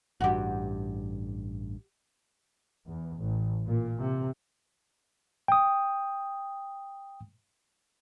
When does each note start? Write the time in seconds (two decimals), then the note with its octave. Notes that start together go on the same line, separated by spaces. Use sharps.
0.21 A1 G2 F#4 G4
2.85 E2
3.17 A1
3.66 A#2
3.99 C3
5.48 G5 D#6